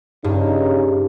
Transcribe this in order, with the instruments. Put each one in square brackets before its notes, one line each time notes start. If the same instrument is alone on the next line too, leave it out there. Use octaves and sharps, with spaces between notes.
[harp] G2 [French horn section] C#3 D#4